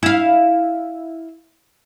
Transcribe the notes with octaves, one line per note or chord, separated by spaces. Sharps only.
E4 F5